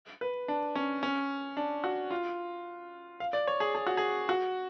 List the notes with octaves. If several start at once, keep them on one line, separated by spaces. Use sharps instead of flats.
B4
D4
C#4
C#4
D4
F#4
F4
F5
D5
C#5
G#4
G#4
F#4
G#4
F#4